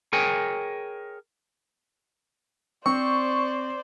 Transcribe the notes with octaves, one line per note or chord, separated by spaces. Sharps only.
G#4 A#4 C#5 G5 G#5
C4 C5 D5 C#6